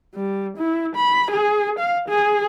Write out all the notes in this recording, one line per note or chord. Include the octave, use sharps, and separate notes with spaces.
G3
E4
B5
G#4
F5
G#4